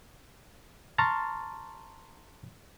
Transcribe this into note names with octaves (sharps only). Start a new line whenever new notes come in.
A5 A#5 C6 C#6 F6 A6